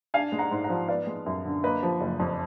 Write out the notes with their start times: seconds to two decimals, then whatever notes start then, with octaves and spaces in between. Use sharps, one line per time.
0.14 D4 F5 G#5
0.32 G#3
0.39 F#5 A#5
0.51 G#2
0.64 F#5 A#5
0.69 F3
0.88 B3 D5 F5
1.07 G#3
1.26 F#2
1.45 D3
1.63 A#3 B4 D#5
1.83 F3
2.01 F#1
2.20 F2